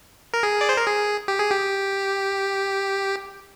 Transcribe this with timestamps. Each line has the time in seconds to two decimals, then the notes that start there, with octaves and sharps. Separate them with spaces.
0.34 A#4
0.43 G#4
0.61 D5
0.69 C5
0.77 A#4
0.87 G#4
1.28 G4
1.39 G#4
1.50 G4